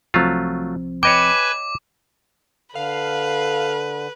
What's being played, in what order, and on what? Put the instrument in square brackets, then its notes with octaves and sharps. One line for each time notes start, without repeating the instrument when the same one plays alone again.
[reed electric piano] C2 F3 C4 [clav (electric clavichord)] F#3 A3 F4
[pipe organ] B4 G#5 [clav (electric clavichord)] C#5 D#5 G5 [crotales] D6
[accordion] D3 [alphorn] A4 [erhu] B4 [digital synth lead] F5